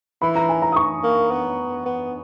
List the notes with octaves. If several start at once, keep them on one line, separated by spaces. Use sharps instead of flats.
E3 B5
A#5
G#5
A#5
D#6
C#6
A#3
B3
B3